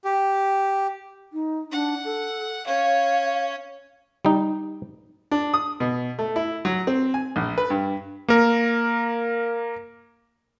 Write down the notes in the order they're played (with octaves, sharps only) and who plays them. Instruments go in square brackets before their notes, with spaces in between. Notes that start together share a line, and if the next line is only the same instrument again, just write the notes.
[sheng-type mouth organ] G4
[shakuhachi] D#4
[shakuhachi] D4 [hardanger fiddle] F#5
[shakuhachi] A4
[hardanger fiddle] C#4 C#5 [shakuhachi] F5
[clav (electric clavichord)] G3 D#4
[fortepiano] D4
D#6
B2
A3
E4
F#3
C4
G#5
A#1
B4
G2
[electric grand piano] A#3 A#4